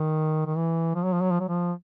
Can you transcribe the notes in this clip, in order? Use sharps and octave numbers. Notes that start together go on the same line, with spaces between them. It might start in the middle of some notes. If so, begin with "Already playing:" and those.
Already playing: D#3
D#3
E3
F3
F#3
F3
F#3
F3
F#3
F3